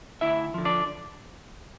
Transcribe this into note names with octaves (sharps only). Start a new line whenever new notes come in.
D2 E4 E5
D3 F3
D4 D5